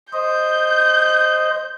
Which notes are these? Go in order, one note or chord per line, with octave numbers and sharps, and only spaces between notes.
C5 D#5 G6